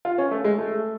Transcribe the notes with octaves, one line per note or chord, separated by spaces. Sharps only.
F4
C#4
A3
G#3
A3